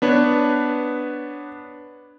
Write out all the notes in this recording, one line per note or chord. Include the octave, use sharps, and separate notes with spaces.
B3 D4 B4 C#5